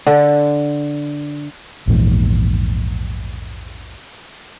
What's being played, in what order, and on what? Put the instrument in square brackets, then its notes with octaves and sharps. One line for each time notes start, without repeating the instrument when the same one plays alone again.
[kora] D3
[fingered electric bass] A#1 E2 G#2